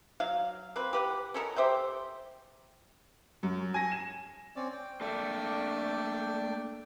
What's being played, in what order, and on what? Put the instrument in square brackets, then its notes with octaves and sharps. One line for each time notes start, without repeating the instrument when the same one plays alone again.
[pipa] F#3 F5
A#3 C4 B4
G4 B4 F#5
C#4 A4 A#4 D#5
G4 C5 E5 G5
[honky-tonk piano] F#2
G#5 A#6
E7
[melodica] C4 C#4 D5
G5
[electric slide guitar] A3 A#3 A4 [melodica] D4 D5 G5